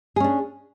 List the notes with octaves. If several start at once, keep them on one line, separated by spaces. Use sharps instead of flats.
C#4 D4 G#4